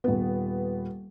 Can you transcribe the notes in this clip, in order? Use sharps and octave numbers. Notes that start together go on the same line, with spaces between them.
D#1 B3